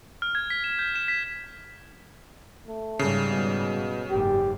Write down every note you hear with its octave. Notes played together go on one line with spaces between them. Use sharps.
F6
G#6
B6
E7
G6
E7
B6
A3
G#2 C#3 G3
B2
F#1 G#2 G4